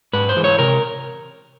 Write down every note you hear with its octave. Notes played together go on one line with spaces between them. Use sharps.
G#2 B4
C5
E3 G#3
C#5
C3 A#4